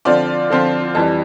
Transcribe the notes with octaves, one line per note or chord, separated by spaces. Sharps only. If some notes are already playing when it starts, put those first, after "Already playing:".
D3 F3 C4 F4 D5
D3 F3 C4 F4
F2 E3 G3 A5